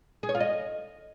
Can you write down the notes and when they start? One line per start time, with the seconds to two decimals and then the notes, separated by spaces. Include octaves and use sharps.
0.23 G#4
0.29 C#5
0.35 F4
0.40 D#5